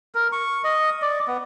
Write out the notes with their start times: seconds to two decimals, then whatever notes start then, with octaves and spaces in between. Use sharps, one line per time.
0.15 A#4
0.32 C#6
0.64 D#5
1.02 D5
1.28 B3